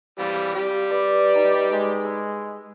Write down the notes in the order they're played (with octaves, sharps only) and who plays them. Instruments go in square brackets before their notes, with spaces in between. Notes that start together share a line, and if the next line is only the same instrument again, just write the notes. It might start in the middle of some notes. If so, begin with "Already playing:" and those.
[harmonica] E3 G3 [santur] C4 [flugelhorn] F5
[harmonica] G3 G4
[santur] B4 [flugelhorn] D5
[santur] D#4
[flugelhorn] G#3
[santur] E6